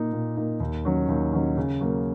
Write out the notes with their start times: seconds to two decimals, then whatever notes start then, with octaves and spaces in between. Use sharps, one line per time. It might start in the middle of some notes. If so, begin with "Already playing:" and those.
Already playing: A#2 A#3 D#4
0.13 A#2
0.37 A#3 D#4
0.60 D#2
0.85 D#3 F#3 C#4
1.09 D#2
1.33 D#3 F#3 C#4
1.57 C#3
1.81 F#3 A#3